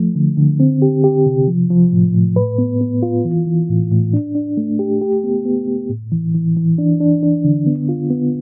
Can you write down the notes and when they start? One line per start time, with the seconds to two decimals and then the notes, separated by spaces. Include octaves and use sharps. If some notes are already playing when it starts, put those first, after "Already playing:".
Already playing: F3 A3
0.15 D3
0.37 D3
0.60 C4
0.82 G4
1.04 G4
1.26 C3
1.48 F3
1.70 F3
1.92 A2
2.15 A2
2.36 B4
2.58 B3
2.81 B3
3.03 F4
3.25 E3
3.47 E3
3.69 A2
3.91 A2
4.13 D4
4.35 D4
4.57 A3
4.79 G4
5.01 G4
5.24 B3
5.45 B3
5.68 B3
5.90 A2
6.12 E3
6.34 E3
6.57 E3
6.78 D4
7.01 D4
7.23 D4
7.45 D3
7.66 B3
7.89 F4
8.10 B3